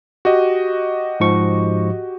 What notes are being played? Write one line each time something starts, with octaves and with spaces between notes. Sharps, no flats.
F#4 G4 D#5
G#2 F3 C#6